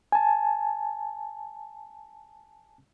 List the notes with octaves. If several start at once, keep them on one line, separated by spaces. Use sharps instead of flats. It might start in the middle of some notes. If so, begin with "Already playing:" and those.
G#5 A5